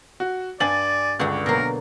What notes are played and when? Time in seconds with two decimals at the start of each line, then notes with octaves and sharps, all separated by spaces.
0.20 F#4
0.60 G2 D5 G#5 A6 F#7
1.19 C#2 G2 D3 F#4
1.46 B2 F#3 A#3 A#4